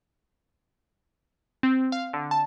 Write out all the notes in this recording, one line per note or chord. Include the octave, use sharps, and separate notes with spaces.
C4
F5
D3
A5